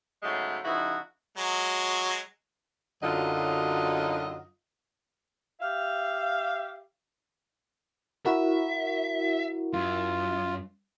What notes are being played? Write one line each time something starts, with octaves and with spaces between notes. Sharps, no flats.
G#2 C#3 F#3 G#3 A3 F4
C#3 F3 D#4 E4 F#4
F#3 G#3
F#2 D3 F#3 D#4 F4 D#5
G4 E5 F5
E4 F#4 A#4 E5
F#2 F4